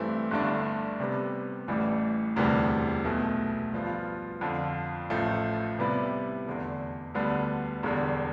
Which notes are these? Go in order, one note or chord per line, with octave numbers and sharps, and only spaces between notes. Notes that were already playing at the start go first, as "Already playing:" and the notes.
Already playing: G2 E3 A3 C4 G4
G1 G2 D3 A3 D4
C3 G3 B3
A1 A2 E3 G3
E1 D2 C3 E3 G3
B1 B2 A3
G2 F3 B3 F4
F2 D3 F3
A1 A2 F3 A3
C3 G3 B3 E4 B4
F1 E2 D3
D2 D3 G3 B3
E1 E2 D3 G3